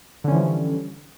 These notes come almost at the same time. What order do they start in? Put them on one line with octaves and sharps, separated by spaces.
D3 C#4 E3 F3 G3